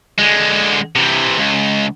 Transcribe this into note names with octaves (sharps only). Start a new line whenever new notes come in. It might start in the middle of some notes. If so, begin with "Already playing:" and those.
D3 G#3
C3 E3
C#2